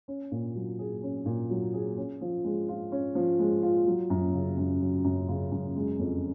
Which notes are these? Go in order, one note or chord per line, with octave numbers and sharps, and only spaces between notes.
C#4
A#2
F#3
G#4
C#4
A#2
F#3
G#4
C#4
F3
G#3
F4
C#4
F3
G#3
F4
F#3
F#2
C#3
F#2
F#3
F#2
C#3
F#2
G#3
F2